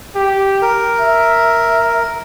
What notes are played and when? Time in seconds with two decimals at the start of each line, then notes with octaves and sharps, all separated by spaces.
0.16 G4
0.62 A#4
1.00 E5